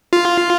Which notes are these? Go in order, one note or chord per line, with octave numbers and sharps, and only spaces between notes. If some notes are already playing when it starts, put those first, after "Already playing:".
F4